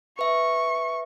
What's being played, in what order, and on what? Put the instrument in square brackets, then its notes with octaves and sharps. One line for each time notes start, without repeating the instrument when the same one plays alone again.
[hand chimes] B4 E5 [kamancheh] C#6